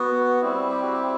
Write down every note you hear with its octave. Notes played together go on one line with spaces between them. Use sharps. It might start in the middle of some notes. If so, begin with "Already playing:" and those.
Already playing: B3 F#4
G3 C4 E4
G4
F#4
G4